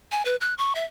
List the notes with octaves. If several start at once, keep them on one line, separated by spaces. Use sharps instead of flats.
G#5
B4
F#6
C#6
E5